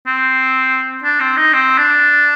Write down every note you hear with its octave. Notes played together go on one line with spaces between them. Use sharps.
C4
D4
C4
D#4
C4
D4